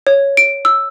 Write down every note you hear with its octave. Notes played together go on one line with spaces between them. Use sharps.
C#5
D7
E6